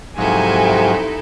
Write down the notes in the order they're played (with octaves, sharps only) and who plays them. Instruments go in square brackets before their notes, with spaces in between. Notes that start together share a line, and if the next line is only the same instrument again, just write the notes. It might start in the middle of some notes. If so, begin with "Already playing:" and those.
[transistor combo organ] G#2 F3 F#3 [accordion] C3 [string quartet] D#4 E4 A4 [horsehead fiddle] G#5